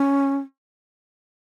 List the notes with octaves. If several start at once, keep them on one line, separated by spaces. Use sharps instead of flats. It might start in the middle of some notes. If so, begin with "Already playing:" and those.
Already playing: C#4